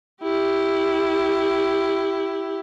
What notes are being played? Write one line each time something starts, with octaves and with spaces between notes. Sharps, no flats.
E4 G4